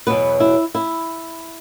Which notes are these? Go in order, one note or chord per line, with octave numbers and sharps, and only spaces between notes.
E2 B2 F#3 B3 B4
E4
E4